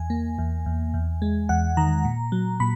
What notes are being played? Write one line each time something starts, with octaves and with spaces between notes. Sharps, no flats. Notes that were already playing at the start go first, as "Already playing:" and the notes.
Already playing: E2 G#5
A#3
E2
E2
E2
G#3
E2 F#5
D#3 A#5
A#2
F#3
A#2 B5